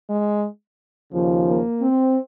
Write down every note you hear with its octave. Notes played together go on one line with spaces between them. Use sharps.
G#3
D#2 C#3 F3
A#3
C4